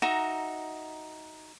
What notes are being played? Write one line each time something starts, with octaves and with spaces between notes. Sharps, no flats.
D#4 F#4 E5 A#5